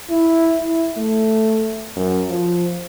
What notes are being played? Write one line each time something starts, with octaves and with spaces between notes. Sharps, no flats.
E4
E4
A3
F#2
F3